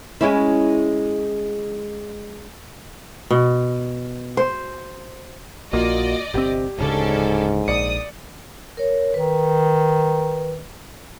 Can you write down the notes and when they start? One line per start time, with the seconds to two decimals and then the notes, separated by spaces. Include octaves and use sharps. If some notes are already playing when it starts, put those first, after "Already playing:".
0.21 G#3 C#4 E4
3.30 B2
4.37 C5
5.73 A#1 A#3 F4 F#4 D5 D#5
6.34 G1 C3 C4 G4
6.78 D1 G#2 C#3 C#4 D4 A4
7.68 A#1 D5 D#6 C#7
8.77 A#4 C#5
9.14 D#3 B4